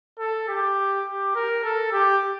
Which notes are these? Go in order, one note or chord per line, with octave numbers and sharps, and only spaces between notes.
A4
G4
G4
A#4
A4
G4